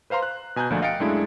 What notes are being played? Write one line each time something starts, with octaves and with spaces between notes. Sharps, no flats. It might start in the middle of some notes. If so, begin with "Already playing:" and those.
B4 C5 F5 A#5 C6
F#6
B2 G#5 A#5 F#6 G6
D2 A#2 F3 A3 D4
D#5 F5 G5 A6 C#7 D7
F#2 G#3 A3 D4 E4